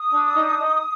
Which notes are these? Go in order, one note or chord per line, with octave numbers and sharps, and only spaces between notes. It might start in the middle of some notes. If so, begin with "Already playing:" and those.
Already playing: D#6
D4
D#4
D#4